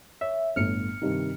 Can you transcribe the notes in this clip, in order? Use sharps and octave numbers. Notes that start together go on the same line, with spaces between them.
C#5 E5
G1 A2 F6 C#7
G2 C3 D#3